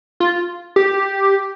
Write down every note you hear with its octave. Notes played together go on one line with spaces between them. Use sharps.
F4
G4